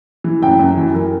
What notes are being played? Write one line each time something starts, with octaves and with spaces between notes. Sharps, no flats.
E3
F#2 G5
F#2
E3
E3 A#4